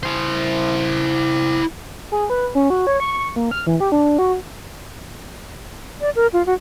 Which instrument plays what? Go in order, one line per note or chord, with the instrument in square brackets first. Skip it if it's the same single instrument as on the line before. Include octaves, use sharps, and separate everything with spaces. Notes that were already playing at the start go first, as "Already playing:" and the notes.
[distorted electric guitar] E4 C5
[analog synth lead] G#4
B4
C#4
F#4
C#5
C#6
A#3
F6
E3
G4
D4
F#4
[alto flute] D5
A#4
F4
F#4